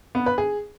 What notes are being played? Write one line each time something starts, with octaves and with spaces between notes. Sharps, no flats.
B3
B4
G#4